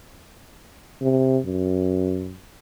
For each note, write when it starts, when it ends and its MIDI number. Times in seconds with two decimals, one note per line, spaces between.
1.02 1.39 48
1.46 2.37 42